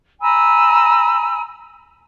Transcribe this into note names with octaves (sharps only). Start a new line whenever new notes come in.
G#5 A#5 B5 E6